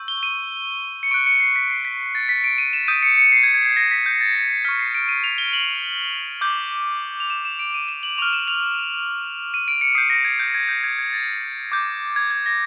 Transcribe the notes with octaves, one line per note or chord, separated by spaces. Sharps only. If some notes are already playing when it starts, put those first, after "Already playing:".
Already playing: C#6 E6 G6
G7
D#7
C#7
C#6 F#6 D7
C#7
C7
B6
C7
B6
A6
B6
D7
D#7
E7
D#6 G6 D#7
C#7
C#7
C7
G#6
G#6
G#6
A#6
B6
G6
A6
A#6
C7
C#6 F6 B6
C7
D7
D#7
F7
G7
F#7
D6 G6
F7
E7
E7
D7
D#7
E7
F#7
C#6 F6 F7
E7
F7
D#7
D7
C#7
D#6 G6 C7
A#6
G#6
G6
G#6
G6
G#6
G#6
A6
D6 G6
G#6
G#6
A#6